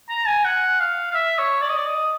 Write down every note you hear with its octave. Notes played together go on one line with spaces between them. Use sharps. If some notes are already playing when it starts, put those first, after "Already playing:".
A#5
G#5
F#5
F5
F5
E5
C#5
D5
D#5
D5
D#5